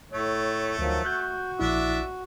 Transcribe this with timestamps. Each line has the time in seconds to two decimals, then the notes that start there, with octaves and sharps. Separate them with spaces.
0.12 A2 A3 C#5
0.79 D2 D#3 F3 F#3
1.05 F#4 F#6 G6
1.59 A#1 D4 E4 E5